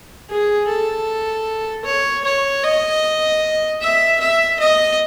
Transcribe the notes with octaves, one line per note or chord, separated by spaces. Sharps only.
G#4
A4
C#5
C#5
D#5
E5
E5
D#5